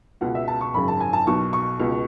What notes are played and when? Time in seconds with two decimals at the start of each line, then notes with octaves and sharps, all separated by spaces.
0.21 C#2 B2 F#5
0.35 E5
0.48 A5
0.61 C#6
0.74 G#1 F#2 C#3 B5
0.88 A5
1.00 G#5
1.13 A5
1.27 B1 B2 C#6
1.53 C#6
1.79 C#2 B2